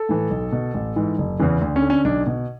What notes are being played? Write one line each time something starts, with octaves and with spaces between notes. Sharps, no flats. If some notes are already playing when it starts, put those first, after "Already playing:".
Already playing: A4
A2 E3
B1
B2
A1
G#2 E3
F#1
E2 C#3 E3
D2
C#4
D3
C#4
B1 D4
B2